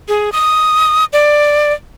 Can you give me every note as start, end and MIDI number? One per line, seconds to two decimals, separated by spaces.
0.08 0.32 68
0.32 1.05 87
1.13 1.73 74